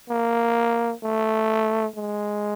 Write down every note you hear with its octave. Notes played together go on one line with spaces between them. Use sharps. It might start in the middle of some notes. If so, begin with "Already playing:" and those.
A#3
A3
G#3